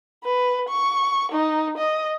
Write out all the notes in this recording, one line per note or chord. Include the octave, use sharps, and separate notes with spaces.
B4
C#6
D#4
D#5